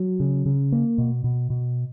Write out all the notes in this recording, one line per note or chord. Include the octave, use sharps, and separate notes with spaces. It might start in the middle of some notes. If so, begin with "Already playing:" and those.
Already playing: F#3
C#3
C#3
A#3
B2
B2
B2